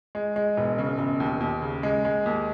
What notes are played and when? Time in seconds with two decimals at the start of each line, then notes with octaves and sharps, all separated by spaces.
0.15 G#3
0.36 G#3
0.57 E1
0.78 C#3
0.99 E1
1.20 D#2
1.40 D#2
1.62 C#3
1.83 G#3
2.05 G#3
2.26 D#2